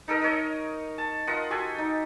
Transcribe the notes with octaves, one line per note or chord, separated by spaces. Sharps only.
D#4 A4 A#4 D#5
A#4 C#5 D#5
A5
F4 A#4 D#5 F#5
F#4 G4 A4 G#5
D#4